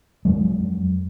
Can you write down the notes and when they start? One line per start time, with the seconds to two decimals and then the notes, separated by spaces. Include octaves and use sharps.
0.25 F2 F#3 G#3